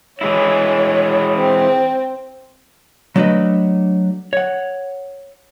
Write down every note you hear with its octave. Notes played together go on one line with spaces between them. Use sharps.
E3 G#3 E4 C#5
C4
F#3 A3 D4 F#4 B4 D#5
C#5 F#5